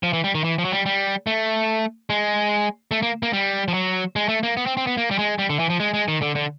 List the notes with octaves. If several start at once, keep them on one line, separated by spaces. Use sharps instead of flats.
F3
E3
G3
D#3
E3
F3
F#3
G3
G3
A3
G#3
A3
A#3
A#3
G3
F3
F#3
G#3
A3
A#3
B3
C4
C4
B3
A#3
G3
G#3
G3
D3
E3
F3
G#3
G#3
D#3
D3
D3